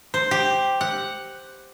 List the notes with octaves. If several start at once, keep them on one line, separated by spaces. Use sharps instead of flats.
C5
G4
F#5